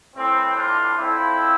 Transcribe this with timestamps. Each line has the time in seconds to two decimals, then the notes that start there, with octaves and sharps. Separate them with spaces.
0.15 A2 E3 G3 C4
0.56 D4 F4
0.98 F2 D3 F3 C4 E4